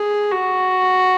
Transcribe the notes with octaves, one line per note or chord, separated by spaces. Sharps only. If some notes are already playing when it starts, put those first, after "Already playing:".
Already playing: G#4
F#4